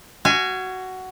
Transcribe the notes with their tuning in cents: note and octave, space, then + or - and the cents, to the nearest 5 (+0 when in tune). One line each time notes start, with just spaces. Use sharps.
F#4 +10 F5 -40 G#5 +5